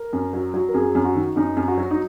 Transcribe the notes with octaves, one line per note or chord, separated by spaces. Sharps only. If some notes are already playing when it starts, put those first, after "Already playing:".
Already playing: A#4
F#2
F#3
F#3
A#4
F#2 G#4
F#2
F#4
D#3
F#2 D#4
F#2
F#4
F#3
D#4